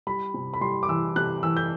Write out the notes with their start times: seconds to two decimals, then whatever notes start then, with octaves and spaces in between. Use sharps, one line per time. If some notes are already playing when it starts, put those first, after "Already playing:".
0.07 G3 B5
0.34 C3
0.54 B5
0.61 G3 C6
0.83 D6
0.89 E3 E6
1.16 C3 F#6
1.43 E3 E6
1.57 G6